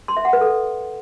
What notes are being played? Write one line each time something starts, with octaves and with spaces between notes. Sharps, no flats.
C6
E5
F#5
B4
A4